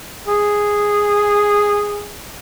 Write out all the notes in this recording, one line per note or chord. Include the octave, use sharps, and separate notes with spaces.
G#4